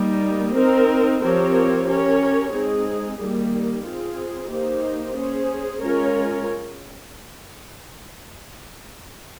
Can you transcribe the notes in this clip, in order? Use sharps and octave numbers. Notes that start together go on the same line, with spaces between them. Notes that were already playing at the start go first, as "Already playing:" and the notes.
Already playing: G3 A#3 D#4
C4 D#4 A#4
F3 C4 G4 A#4 C#5
C#4 G4 A#4 C#5
G#3 C4 D#4 G#4
D#3 G3 A#3
C4 F4 G#4
A#3 D#4 G4 C5
C#4 G#4 C5
G#3 C#4 F4 A#4 C#5